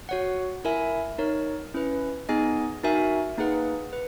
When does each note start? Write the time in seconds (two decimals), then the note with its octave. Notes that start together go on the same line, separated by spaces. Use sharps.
0.09 F#4 C#5 F#5
0.65 E4 A#4 E5 G#5
1.18 D#4 A#4 C#5
1.74 C#4 E4 B4
2.29 B3 D#4 G#4 D#5 G#5
2.83 D#4 F#4 A#4 E5 G#5
3.37 A#3 D#4 G#4 B4 F#5
3.93 B4